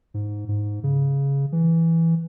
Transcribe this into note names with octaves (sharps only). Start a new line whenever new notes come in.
G#2
G#2
C#3
E3